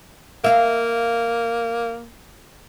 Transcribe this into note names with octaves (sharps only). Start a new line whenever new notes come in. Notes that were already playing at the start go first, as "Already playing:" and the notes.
A#3 E5 F5